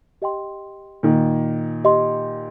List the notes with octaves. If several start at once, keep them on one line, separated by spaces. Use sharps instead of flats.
G4 D#5 G5 C6
A#2 D#3
G4 D#5 C6